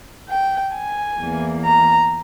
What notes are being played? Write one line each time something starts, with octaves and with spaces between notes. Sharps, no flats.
G5
G#5
E2 E3 A#3
A#5